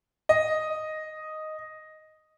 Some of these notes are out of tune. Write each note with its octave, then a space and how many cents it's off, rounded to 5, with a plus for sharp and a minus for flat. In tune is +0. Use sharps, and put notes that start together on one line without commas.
D#5 +0